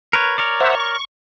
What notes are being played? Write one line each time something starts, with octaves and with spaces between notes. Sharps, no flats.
A#4 B4 C#5
A#4 C#5 D5
C5 E5 F#5
C#6